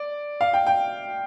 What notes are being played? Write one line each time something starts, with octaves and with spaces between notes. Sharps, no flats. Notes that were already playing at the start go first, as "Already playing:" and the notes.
Already playing: D5
F5
G5
G5